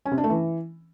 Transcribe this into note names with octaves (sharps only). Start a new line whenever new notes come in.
C#4
C3
D4
A3
E3